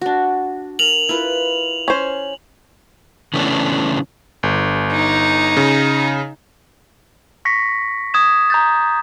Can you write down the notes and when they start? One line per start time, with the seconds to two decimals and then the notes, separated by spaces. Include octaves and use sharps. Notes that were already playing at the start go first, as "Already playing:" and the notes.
0.01 D4 F#4
0.79 A#4 F7 F#7
1.09 E4 F4 B4
1.88 C#4 C5
3.34 C#3 E3 A3 B3 C#4 D4
4.43 G1
4.92 D#4
5.57 C#3
7.45 C#6 A#6 B6 C#7
8.14 D#6 G#6 E7
8.50 A#5 G6 A6